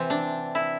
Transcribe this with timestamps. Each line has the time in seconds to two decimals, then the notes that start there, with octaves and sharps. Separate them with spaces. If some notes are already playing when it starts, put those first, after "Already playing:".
Already playing: C3 E3 C4
0.10 D4
0.55 E4